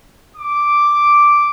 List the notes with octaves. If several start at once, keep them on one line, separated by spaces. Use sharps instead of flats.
D6